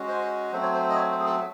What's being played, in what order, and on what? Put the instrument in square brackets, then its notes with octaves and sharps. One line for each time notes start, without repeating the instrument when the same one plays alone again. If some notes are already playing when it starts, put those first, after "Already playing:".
Already playing: [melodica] G#3 C#4 F#4
C5
F#3 A3 C4 C5
C#5
C5
D#5
C#5
C5
G#4
A4